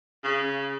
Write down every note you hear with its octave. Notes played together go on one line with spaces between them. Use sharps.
C#3